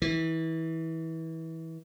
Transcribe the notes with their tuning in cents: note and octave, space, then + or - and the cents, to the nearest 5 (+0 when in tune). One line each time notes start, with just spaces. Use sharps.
E3 -25